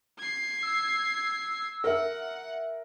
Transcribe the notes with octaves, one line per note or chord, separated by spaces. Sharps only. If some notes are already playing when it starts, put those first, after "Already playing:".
G#6 C7
E6
A#4 E5 F#5